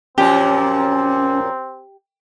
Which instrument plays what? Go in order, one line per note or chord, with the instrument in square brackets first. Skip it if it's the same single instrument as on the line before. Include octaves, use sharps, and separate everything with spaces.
[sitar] F#2 A#2 F3 [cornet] C4 [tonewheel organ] C#4 [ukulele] G4